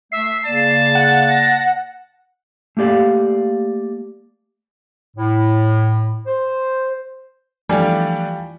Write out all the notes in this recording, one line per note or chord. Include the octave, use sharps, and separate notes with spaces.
A3 E5 C7
C#3 A#3 D5 A5 E7
F#5
A#6
A3 A#3 G4 D5 F5
A2
C5
E3 F3 G3 A3 D4 D5 F5 G#5